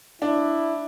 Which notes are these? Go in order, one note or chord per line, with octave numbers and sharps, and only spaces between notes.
D4 E4